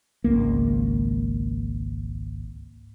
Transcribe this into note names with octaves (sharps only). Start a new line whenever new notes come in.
G#1 C#2 A#3